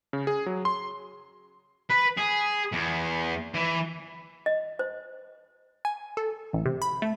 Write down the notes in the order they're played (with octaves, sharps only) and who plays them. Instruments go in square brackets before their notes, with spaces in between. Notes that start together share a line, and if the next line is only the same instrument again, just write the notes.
[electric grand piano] C#3
G#4
F#3
C6
[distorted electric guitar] B4
G#4
E2
E3
[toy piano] D#5
C5
[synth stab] G#5
A4
A1
C3
B5
A3